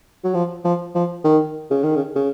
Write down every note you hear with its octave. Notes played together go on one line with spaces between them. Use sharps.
F#3
F3
F3
F3
D#3
C#3
D#3
C#3
C#3